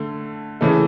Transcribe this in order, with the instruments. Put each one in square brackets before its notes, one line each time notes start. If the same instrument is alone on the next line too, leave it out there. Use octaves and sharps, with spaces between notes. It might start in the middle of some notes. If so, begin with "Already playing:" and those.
Already playing: [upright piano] D3 A3
C#3 E3 A3